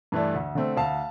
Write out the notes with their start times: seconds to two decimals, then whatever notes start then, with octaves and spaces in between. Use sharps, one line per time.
0.12 G2 E3 A3 D4
0.35 D2
0.55 D3 A3 C4
0.77 D2 F5 A5